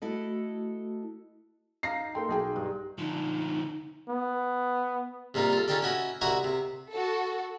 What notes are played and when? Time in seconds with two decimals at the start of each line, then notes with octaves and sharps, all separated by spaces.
0.02 A3 E4 F#4 A4 D#5
1.83 D#4 F5 A#6 C7
2.15 A#3 A4 G5 C6
2.29 B1 G#4 G5
2.56 G2
2.99 D3 F3 D#4
4.09 B3
5.34 C3 G3 A#3 D#4 F4
5.53 F4 A4
5.68 C#4 D#4 F4 G4 A4 D5
5.82 C#4 E4 F#4 D#5
6.21 C2 E4 F#4 D#5 A#5 C#6
6.44 C3
6.92 F#4 A4